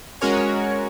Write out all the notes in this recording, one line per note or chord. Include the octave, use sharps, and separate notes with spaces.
G#3 C#4 F#4 A#4 C#5 G#5